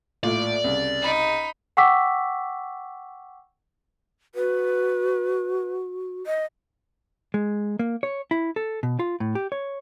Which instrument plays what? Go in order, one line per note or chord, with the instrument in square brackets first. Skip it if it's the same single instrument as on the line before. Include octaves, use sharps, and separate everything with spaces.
[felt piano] A#1 A2 F4 [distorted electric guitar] D5
[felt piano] C2 C#3
[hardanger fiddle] D#4 B5
[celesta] F#5 G5 C#6 D6 E6 B6
[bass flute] F#4 [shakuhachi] B4
[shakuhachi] D#5
[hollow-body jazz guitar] G#3
A#3
C#5
E4
A4
B2
F4
A2
G4
C#5